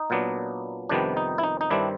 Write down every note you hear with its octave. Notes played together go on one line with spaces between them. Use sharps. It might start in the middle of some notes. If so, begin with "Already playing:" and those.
Already playing: D#4
A#2 F#3 B3 D4
F2 C3 D#3 G3 B3 D4
D#4
E4
D#4
D#4
G2 D#3 G3 C4 D4 E4